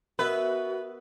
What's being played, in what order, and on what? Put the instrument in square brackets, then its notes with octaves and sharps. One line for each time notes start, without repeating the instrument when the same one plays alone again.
[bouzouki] B3 E5 [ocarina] F#4 [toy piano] A#4 D#5 [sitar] B4